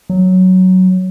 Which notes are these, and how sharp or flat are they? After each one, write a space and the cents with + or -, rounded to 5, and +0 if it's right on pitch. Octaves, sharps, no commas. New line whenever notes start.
F#3 +5